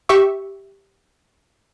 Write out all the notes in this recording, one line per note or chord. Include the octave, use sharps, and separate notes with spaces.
G4 E5 C#6